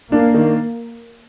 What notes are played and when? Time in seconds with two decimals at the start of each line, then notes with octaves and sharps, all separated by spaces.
0.12 A#3 D4
0.34 D#3